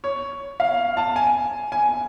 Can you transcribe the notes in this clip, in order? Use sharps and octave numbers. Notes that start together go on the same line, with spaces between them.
C#5
F5
A5
G#5
G#5